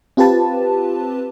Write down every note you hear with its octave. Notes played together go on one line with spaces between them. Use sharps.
C4 F4 G4 B4 A5